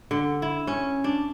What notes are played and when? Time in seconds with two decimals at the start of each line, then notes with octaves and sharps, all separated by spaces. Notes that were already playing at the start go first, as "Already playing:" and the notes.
0.11 D3
0.42 E4
0.67 C#4
1.04 D4